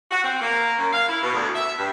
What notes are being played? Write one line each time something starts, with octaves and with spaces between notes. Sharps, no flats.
F#4
C4
A#3
F#2
F5
E4
B2
D2
E5
G2